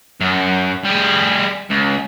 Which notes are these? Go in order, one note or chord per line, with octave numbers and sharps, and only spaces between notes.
F#2
G3 G#4
C#2